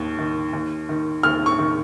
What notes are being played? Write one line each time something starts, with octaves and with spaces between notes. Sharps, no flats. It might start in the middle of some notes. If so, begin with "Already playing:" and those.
Already playing: D#2 D#3
D#3
D#2
D#3
D#2 F6
C#6
D#3